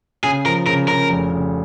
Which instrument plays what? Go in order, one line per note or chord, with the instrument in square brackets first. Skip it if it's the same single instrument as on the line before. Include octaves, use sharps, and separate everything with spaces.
[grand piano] C#3 [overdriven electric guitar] G#4
[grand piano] F3 [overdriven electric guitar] A#4
[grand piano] C#3 [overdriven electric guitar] A#4
[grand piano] C#3 [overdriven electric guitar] A#4
[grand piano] F1
C#3